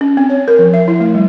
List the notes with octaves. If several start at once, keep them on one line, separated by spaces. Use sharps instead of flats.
C#4
C4
C#5
A#4
F3
E5
E4
A3
G3